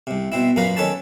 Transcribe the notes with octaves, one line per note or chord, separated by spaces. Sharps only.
C2 C3
B2 C4 E4
F#2 A#2 A#3 A#4 B4 F5
D#3 C#4 A4 B4 C#5 A5